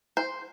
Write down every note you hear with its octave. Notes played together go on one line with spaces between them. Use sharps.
C5